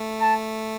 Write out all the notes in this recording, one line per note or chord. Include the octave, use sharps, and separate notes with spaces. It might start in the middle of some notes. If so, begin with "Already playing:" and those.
Already playing: A3
A5